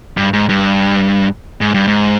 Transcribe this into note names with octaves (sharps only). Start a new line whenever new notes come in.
G2
G#2
G2
G#2
G2
G#2